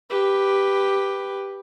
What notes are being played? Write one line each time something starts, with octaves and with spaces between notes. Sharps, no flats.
G4 B4